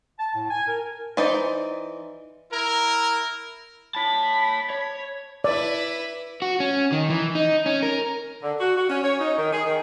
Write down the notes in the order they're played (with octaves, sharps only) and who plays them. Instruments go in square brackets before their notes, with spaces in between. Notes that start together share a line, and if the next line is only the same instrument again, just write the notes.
[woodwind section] A5
A2
G#5
A#4
[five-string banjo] E3 D#4 C5 D5
[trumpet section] E4 A#4
[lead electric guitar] C#5 A5 [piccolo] B5
[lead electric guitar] C#5
[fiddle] E4 B4 [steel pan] D5
[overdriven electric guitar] F#4
C#4
D#3
E3
D#4
C#4
A#4
[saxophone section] D3
F#4
F#4
C#4
C#5
D#4
D#3
G#4
D#3